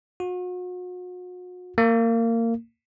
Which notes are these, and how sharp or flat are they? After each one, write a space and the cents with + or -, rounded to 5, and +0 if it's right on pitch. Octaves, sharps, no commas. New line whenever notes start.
F#4 -40
A#3 -25